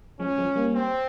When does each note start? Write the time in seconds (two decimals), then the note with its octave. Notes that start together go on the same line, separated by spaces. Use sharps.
0.19 F3 G#3 C#4
0.38 F3 G#3
0.56 G3 A#3
0.74 C4